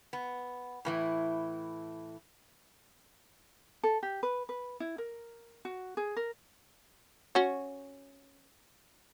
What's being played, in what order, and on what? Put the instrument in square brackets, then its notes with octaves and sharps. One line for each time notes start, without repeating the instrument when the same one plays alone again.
[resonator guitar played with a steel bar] B3
A2 E3 E4
[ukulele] A4
G4
B4
B4
E4
A#4
F#4
G#4
A#4
[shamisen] C#4 F#4